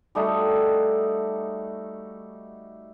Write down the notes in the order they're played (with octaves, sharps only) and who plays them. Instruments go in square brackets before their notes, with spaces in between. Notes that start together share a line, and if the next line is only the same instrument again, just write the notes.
[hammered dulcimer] G3 A3 D#4 F#4